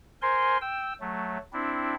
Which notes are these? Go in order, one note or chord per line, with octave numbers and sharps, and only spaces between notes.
A#4 C5 G#5 C6
G5 E6
F#3 A3
C4 D4 E4